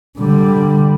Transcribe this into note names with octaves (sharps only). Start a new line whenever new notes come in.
D3 G3